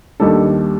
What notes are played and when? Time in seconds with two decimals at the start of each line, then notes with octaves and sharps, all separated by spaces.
0.20 D#2 D#3 G3 D4 A4